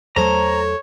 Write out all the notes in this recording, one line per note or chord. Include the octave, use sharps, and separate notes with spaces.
E2 F#3 A3 A4 C5 C#5 A#5